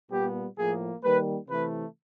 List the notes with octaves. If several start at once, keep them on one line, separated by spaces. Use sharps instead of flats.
A#2 G3 B3 G4
A2 F3 A#3 G#4
D#3 G3 A#3 B4
C3 E3 A3 B4